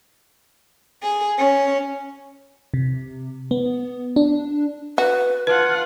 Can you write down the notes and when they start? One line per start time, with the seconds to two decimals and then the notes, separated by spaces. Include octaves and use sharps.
1.03 G#4
1.38 C#4
2.74 C3
3.51 B3
4.16 D4
4.98 F#4 B4
5.47 F4 B4 F#5 A5